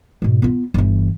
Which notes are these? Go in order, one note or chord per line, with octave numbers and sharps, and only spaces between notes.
G#2 B2
B3 F4
G1 E3